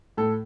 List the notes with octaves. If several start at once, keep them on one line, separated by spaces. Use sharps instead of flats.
A2 A4